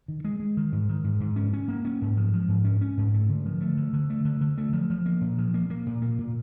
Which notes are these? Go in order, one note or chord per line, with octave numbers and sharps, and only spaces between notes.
D#3
G#3
G#3
D#3
G#2
D#3
G#2
G#2
C#4
C#4
A#3
C#4
G#2
F3
F3
G#2
C#4
C#4
G#2
A3
D3
F3
A3
D3
D3
A3
D3
D3
A3
F3
F3
A#3
A#2
F3
A#3
A#3
A#2
A#3
A#2